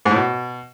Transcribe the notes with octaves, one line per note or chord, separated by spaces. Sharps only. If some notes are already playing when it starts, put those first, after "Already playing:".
G#2
A2
B2